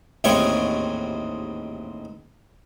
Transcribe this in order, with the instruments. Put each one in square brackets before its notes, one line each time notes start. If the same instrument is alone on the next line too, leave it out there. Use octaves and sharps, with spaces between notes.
[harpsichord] A1 D#2 G#2 C4 C#5 C#6